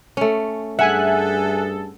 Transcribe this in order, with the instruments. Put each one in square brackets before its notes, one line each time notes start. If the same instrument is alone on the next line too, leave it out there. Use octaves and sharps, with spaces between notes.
[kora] A3 C#4
[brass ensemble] G2 G#4 A4 [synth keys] E5 G#5 F#6 [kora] F#5